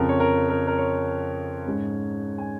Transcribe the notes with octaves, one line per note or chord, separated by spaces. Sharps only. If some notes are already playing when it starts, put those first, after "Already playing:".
Already playing: F2 C#3 F3 A#4
C#5
A#4
A#4
A#4
C#5
G#2 G#3 C#4
G#5